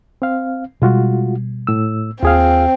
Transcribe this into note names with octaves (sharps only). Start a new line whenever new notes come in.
C4 F5
B2 G3 G#3 F4 F#4
A2 E6
D#2 C4 F4 G#4 F5